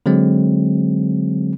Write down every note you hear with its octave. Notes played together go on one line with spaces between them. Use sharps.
D3 F#3 G#3 C4